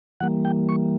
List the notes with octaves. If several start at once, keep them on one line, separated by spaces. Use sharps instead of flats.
E3 G3 A#3 F#5
G5
C#6